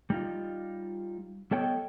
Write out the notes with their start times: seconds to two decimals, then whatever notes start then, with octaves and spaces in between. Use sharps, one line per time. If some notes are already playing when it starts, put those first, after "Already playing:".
0.10 G3 D#4 F4
1.51 G3 B3 A4 C#5 D#5 G5